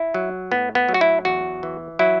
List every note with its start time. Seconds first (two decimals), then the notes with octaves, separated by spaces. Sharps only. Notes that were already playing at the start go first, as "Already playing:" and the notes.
Already playing: E4
0.14 F#3
0.51 A2 B3
0.75 B3
0.89 F#3
0.94 F#4
1.01 E4
1.25 E2 F#4
1.63 E3
1.99 F#3 E4